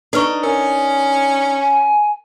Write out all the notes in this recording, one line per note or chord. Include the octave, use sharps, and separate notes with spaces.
D4 D#4 A4 B4 C#6
C#4 A#4
G#5